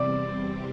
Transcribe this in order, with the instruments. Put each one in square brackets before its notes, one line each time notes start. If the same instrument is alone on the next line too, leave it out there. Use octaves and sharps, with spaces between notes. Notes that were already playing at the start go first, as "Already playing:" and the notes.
Already playing: [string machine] E2 C3 G3 C4 [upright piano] D5